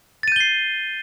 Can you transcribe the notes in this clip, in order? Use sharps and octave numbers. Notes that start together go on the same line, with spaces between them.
G6 A6 C7 D#7 G7